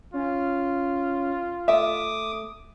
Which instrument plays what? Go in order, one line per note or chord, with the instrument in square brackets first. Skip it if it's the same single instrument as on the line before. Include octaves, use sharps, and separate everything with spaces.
[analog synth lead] C#4 [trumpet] F4
[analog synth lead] A3 [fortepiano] E5 [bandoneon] D6 D#6